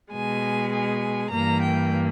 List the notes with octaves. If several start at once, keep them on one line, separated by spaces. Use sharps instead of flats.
B2 G#3 G#5
G#5
G2 E3 A#3 A#5
G5